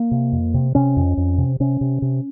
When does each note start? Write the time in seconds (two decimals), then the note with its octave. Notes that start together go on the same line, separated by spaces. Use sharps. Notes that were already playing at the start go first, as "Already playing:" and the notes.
Already playing: A#3
0.11 C3
0.32 F2
0.54 C3
0.75 C3 C#4
0.97 F2
1.17 F2
1.38 C3
1.60 C3 C#4
1.81 C3
2.02 C3